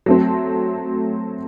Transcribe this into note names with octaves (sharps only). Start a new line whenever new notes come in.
F#3 A3 C4